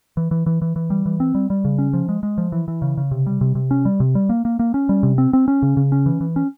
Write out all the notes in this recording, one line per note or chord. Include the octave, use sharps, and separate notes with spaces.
E3
E3
E3
E3
E3
G3
E3
C4
G3
G3
C#3
C#4
F3
G#3
G#3
F3
E3
E3
C#3
C#3
C3
G3
C3
C3
C#4
G3
C3
G3
A#3
A#3
A#3
C#4
G3
C3
C4
C4
C#4
C#3
C#3
C#4
E3
E3
C#4